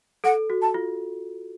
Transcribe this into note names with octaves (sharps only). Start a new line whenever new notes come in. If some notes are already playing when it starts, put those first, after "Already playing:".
A4 F#5
F#4
A5
F4